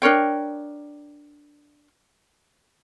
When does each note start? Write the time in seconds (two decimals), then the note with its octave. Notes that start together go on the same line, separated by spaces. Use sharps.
0.02 D4 A#4 C#5 G5